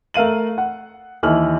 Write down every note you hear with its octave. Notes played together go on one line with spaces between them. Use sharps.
A3 A#4 F5 D#7 F#7
F#5
D#2 E3 D#5 F6 F#7